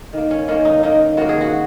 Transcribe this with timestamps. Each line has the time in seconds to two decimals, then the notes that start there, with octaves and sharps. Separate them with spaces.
0.13 D#3 A#3
0.31 C#4
0.48 D#3 A#3 C#4
0.65 D#4
0.83 D#3 A#3 D#4
1.17 D#3 A#3 F#4
1.29 G#4
1.41 F#4